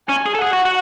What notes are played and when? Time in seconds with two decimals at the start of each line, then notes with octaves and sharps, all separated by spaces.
0.09 C#4 G#5
0.26 G#4
0.35 A4
0.42 G#4 F#5
0.53 F#4
0.65 F#4